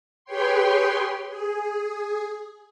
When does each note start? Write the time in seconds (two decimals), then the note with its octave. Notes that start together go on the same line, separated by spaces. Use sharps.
0.25 G4 G#4 B4 C#5 G5 C6
1.28 G#4